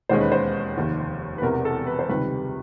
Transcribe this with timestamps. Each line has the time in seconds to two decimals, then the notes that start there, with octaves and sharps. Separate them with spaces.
0.09 E1 D#2 D#3 G#3 C#4 C5
0.21 B4
0.32 C5
0.77 F1 D#2 D#3
1.38 B4
1.42 E1 E2 C3 A#4
1.65 A4
1.87 B4
1.99 C5
2.09 C#2 C3 D#3 G3 B4